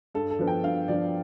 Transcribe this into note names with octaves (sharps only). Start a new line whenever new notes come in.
G2 A4
A4
F3 B3 D4
G5
G2 F5
F3 B3 D4 D5